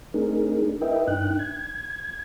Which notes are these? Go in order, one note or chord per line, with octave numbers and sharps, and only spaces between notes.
A3 C4 D4 D#4 G#4 A#4
E4 A#4 B4 D#5 E5 G5
G2 D4 D#4 G5 F#6
G#6